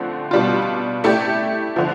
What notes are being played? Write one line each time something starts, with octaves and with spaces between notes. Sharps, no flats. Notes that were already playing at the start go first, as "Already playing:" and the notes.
Already playing: D3 F3 A3 C4
B2 G3 D4 F4
A3 E4 G4 D5
D3 F3